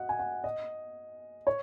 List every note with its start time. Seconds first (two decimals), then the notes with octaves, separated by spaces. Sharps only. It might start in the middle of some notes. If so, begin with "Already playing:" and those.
Already playing: F#4 D#5 F#5
0.09 G#5
0.19 F#5
0.44 D#5
1.47 C#5